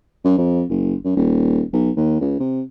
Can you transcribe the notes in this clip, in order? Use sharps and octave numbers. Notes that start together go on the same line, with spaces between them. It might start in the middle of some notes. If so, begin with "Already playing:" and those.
F#2
F2
F#1
F#2
D#1
B1
D#2
C#2
C3